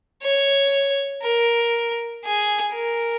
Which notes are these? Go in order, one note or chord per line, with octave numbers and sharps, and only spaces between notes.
C#5
A#4
G#4
A#4